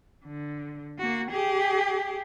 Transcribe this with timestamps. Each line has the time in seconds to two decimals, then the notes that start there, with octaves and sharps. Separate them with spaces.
0.24 D3
0.98 A#3 F#4
1.31 G4 G#4